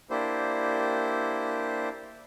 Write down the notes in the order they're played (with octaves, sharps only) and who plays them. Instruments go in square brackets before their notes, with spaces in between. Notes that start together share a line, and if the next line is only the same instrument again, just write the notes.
[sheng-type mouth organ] A#3 D4 E4 G4 C5